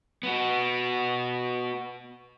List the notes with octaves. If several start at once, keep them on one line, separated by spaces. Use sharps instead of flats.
B3 F#4